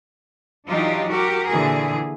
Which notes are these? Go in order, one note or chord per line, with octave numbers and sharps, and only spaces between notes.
E3 F#3 D4 D#4 F4 G4
F#4 G4 A#4
A#2 D3 E3 G#4